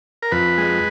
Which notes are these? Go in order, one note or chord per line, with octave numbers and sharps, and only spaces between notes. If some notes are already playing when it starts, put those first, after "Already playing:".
A#4
F2 B4
G#3